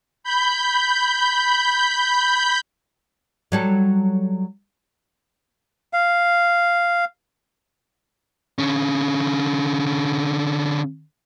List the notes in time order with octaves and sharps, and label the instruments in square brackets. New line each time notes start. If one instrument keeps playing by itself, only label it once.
[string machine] B5 G6
[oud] F#3 G3 A4
[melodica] F5
[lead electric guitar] D3 C#4